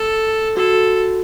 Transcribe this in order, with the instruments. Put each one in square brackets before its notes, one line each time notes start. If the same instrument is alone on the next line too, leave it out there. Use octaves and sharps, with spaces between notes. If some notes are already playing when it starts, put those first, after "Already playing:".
Already playing: [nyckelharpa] A4
[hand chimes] F#4 [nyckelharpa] A4